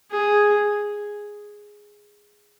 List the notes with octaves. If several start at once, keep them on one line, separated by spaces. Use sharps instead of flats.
G#4